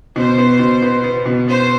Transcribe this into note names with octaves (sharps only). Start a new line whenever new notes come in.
B2 C5
B3
B2
B3
B3
B2
B3 C5